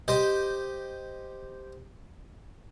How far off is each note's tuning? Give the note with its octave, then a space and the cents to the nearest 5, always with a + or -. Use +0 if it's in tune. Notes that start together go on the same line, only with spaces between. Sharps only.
G4 +0 C5 -10 D#5 +0